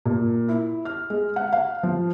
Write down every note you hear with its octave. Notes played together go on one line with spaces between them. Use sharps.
A#2
E4
F6
G#3
F#5
F5
F3